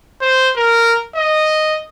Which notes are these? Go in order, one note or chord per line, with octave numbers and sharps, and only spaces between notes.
C5
A#4
D#5